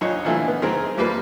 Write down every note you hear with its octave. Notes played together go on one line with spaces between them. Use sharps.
A#1 D#4 C#5
A#2 D3 E3 A3
B3
D#3 C4 D#4 G#4 A#4
F3 G3 A#3 B4